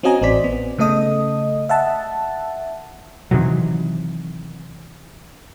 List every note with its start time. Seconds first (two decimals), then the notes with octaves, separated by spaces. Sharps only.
0.03 C4 C#4 F#4 D#5 G#5 A#5
0.22 A1 C4 C5 D5 B6
0.44 B3
0.78 C#3 A3 A4 D#5 D#6
1.69 E5 F#5 A5
3.31 C3 D#3 E3 F#3